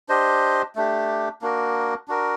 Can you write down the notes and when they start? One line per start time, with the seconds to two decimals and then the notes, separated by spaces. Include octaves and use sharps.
0.09 D4 G4 C5 D#5
0.76 A3 D4 G4
1.42 A#3 D4 F#4 A#4
2.08 D4 F#4 A#4